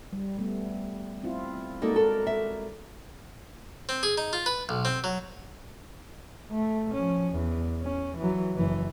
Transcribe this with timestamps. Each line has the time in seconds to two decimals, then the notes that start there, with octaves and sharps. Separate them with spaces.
0.13 G3
0.38 G3 A3 B3
1.23 C4 E4 F4
1.82 G#3 A#3 D#4 F#4 A4 D5
1.96 A4 A#4
2.27 E5
3.89 C4
4.03 G#4
4.18 D#4
4.33 F4
4.46 B4
4.69 B1
4.85 C4
5.04 F#3
6.51 A3
6.94 F3 C#4
7.32 E2
7.82 C#4
8.17 E3 F#3
8.56 F#1 E3